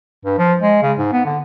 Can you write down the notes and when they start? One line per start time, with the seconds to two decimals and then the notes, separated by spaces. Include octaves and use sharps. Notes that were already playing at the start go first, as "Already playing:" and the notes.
0.25 G2
0.38 F3
0.61 G#3
0.82 C#3
0.98 G#2
1.12 B3
1.25 D3